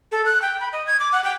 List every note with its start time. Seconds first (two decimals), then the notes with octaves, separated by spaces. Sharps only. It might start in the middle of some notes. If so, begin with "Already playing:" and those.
0.12 A4
0.26 F#6
0.42 G5
0.60 B5
0.73 D#5
0.87 G#6
1.00 D6
1.13 F#5
1.24 G5